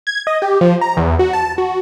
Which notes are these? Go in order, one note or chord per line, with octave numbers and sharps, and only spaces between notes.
G#6
D#5
G4
F3
A#5
E2
F#4
A5
F#4